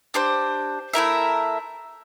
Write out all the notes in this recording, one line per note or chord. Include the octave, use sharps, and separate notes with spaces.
D4 G4 C5
A3 E4 A#4 E5